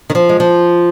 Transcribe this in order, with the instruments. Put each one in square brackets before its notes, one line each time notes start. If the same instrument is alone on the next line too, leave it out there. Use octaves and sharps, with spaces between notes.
[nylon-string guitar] D#3
F3
G#3
F3